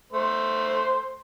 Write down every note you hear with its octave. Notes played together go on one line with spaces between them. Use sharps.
A3 C5